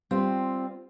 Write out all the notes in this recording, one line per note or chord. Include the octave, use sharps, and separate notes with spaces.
G3 C4 F4